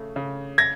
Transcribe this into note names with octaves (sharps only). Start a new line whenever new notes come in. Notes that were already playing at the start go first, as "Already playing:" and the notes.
Already playing: C#3 A3
C#3
G#6 A#6